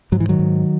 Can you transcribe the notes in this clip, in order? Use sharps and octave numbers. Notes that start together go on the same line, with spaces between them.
G#2 F#3
E3
D#3 F#3
G#2